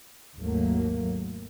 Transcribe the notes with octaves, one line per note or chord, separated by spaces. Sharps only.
G#1 D#2 F#3 A3 A#3